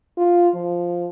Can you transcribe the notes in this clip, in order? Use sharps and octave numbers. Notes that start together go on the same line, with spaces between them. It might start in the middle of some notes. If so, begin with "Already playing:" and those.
F4
F3